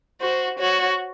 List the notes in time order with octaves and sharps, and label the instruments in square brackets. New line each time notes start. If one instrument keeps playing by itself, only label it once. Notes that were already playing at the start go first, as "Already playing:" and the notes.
[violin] F#4 [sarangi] C5
[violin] F#4 [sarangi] C#5